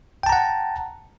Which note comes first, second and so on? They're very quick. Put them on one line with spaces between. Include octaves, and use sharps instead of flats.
G5 A5 A#5 F#5